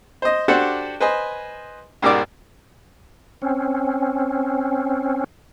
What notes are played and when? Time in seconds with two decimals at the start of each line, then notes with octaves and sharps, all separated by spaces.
0.22 C5 D#5
0.48 D4 F#4 G4 A4 C5 F#5
1.01 B4 C5 D#5 G#5
2.02 G#2 B2 G4 A#4 D5 D6
3.42 C4 C#4